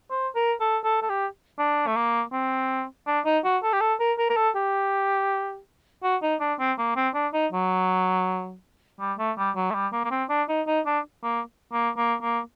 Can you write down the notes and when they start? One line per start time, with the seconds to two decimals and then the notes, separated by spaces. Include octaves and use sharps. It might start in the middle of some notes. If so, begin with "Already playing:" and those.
0.11 C5
0.36 A#4
0.60 A4
0.84 A4
1.02 A4
1.09 G4
1.59 D4
1.87 A3
1.96 A#3
2.32 C4
3.07 D4
3.26 D#4
3.45 F#4
3.63 A4
3.73 G4
3.81 A4
4.00 A#4
4.19 A#4
4.30 A#4
4.37 A4
4.55 G4
6.03 F#4
6.23 D#4
6.40 D4
6.60 C4
6.78 A#3
6.96 C4
7.14 D4
7.34 D#4
7.52 F#3
9.00 G3
9.19 A3
9.38 G3
9.56 F#3
9.71 A3
9.74 G3
9.93 A#3
10.04 A#3
10.11 C4
10.30 D4
10.49 D#4
10.67 D#4
10.86 D4
11.23 A#3
11.72 A#3
11.97 A#3
12.22 A#3